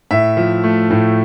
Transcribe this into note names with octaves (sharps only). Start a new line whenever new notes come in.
A2 E5
F3
A3
A2